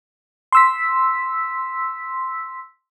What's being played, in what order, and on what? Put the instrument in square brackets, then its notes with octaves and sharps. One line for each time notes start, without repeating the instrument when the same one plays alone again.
[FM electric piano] C6 E6 B6